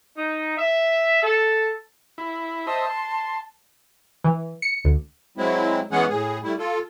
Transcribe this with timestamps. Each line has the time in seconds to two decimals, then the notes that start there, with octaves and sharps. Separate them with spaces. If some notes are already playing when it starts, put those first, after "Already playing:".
0.17 D#4
0.58 E5
1.23 A4
2.18 E4
2.67 C5 D#5 E5 A5
2.90 C6
4.24 E3
4.62 C#7
4.85 D2
5.38 F#3 G#3 C4 E4
5.91 E3 G#3 B3 C#4 G#4 F#5
6.09 A2 G#4
6.43 G3 A3 E4
6.58 F4 A4